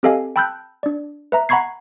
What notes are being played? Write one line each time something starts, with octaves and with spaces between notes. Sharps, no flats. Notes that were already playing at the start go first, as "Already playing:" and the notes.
C4 G4 A4 D#5 F5 G#5
G5 A5 B5 E6 F#6 G6
D4 D5
B4 E5 A#5
F#5 A#5 B5 C#6 G#6 C7